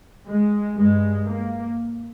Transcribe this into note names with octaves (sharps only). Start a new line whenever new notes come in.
G#3
G2 G#3
A#3